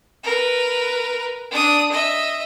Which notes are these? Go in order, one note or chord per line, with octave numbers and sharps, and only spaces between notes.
A#4 B4
D4 D#6
D#5 E5